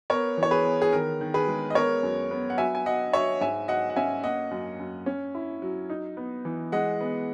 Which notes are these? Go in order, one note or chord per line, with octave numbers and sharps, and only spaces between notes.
B3 A#4 C#5
E3
C#5
G#4 B4
B3
G#4
D#3 A#4
D#3
G#4 B4
G#3
D#5
B3 A#4 C#5
F#2
B3
F#5
F#3 E5 G#5
G#5
F#3 D#5 F#5
F#3 C#5 E5
G#2 E5 G#5
F#3 D#5 F#5
F#5
C#4 E5 G#5
A#3 D#5 F#5
F#2
F#2
C#4
E4
F#3
D#4
B3
E3
G#3 D#5 F#5
B3